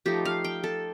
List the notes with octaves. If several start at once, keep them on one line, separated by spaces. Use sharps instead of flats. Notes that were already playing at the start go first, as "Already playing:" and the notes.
F3 A3 D#4 G4
F5
G5
A4